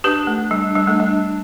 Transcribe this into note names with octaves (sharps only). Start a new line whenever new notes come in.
D4 G4 B4
A3
G3
G3
A3
G3